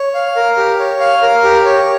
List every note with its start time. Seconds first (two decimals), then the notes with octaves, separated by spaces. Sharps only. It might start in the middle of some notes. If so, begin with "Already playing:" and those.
Already playing: C#5
0.15 F5
0.36 A#4
0.57 G4
0.79 C#5
1.00 F5
1.22 A#4
1.44 G4
1.65 C#5